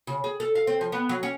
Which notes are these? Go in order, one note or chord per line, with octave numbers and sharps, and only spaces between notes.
C#3
G#4
A4
F5
C4
F3
B3
F#3
C#4